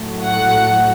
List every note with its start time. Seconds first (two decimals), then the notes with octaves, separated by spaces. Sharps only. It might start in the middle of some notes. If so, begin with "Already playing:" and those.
Already playing: A2 F#3 A3
0.24 F#5